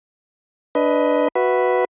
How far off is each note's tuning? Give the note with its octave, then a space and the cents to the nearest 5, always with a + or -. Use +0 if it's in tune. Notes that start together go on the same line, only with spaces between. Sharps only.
D4 +0 B4 +5 D#5 +20
F#4 +0 B4 +0 E5 +0